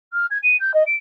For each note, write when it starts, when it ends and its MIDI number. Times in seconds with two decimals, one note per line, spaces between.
0.13 0.26 89
0.30 0.38 92
0.43 0.56 99
0.59 0.73 91
0.74 0.83 75
0.86 0.95 98